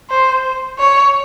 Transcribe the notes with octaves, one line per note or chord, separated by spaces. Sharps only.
C5
C#5